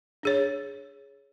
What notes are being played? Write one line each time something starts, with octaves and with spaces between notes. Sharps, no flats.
D4 G#4 C#5